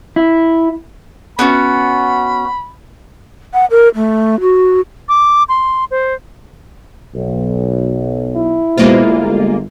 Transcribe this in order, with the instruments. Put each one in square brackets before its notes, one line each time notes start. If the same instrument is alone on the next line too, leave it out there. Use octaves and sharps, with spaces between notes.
[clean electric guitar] E4
[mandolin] B3 C#4 F#4 [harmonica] B5
[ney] F#5
A#4
A3
F#4
[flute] D6
C6
C5
[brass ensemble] B1
[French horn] E4
[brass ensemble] B2 C5 [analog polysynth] G#3 A#3 F4
[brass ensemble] G1